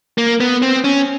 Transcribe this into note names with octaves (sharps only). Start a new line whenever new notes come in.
A#3
B3
C4
C#4